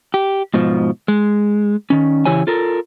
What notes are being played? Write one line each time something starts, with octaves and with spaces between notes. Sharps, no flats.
G4
G#2 B2 F3
G#3
D#3 C#4
C#3 E3 E4 G4 C#5 G#5
F4 A4 A#4